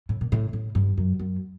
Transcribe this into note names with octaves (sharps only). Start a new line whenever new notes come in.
A2
A#2
A2
A2
G2
F#2
F#2